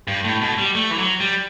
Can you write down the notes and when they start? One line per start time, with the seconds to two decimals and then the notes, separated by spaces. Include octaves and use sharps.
0.07 G2
0.24 A2
0.41 B2
0.58 G3
0.75 A3
0.91 E3
0.98 F#3
1.20 G3